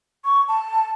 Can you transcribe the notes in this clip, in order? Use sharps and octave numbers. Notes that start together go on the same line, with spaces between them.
C#6
A5